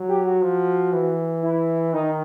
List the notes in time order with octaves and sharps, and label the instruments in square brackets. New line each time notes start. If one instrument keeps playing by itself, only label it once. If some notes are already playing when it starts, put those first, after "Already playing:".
Already playing: [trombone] F#3
[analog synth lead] G4
F#4
[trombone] F3
E3
[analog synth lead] E4
[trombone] D#3 [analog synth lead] D#4